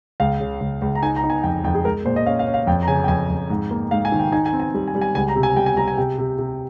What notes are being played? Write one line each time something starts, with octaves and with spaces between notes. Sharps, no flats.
C#2 F5
C#3
C#2
C#2
A#5
D#4 G#5
A#5
D#4
G#5
F2 G5
F2 G5
G#4
G#3 A#4
A#2 C5
D#5
C#4 F5
F5
C#4
F5
F2 G5
A#5
C#3 G#5
G5
F2 G#5
F2
G#2
A#3
G#2 F5
G#5
D#3
G5
D#4 G#5
G#5
C4
G#5
G3
G#5
G3
G#5
C#2 G#5
A#5
C3
G#5
G3 G5
G#5
G3 A#5
G#5
C3 G5
C3
C3